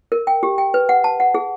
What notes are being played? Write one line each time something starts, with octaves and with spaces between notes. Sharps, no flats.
A#4
G5
G4
G5
B4
F#5
A5
F#5
G#4